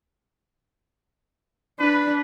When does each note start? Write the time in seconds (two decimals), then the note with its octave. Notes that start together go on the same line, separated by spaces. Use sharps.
1.80 D4 B4